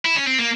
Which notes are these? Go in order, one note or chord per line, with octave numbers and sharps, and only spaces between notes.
E4
C#4
C4
A#3